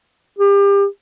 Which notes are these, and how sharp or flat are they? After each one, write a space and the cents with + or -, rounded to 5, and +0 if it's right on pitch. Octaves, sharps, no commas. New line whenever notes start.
G4 +30